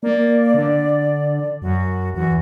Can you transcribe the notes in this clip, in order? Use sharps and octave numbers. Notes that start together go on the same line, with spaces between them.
A#3 D5
D3
F#2 F#4
E2 F#4